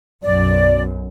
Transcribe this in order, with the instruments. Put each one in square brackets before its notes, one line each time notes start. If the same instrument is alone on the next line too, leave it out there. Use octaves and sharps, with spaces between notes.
[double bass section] B1 F#2 [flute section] D5